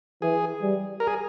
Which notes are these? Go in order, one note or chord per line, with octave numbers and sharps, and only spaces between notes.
E3 G#4
G3
A#4
G#4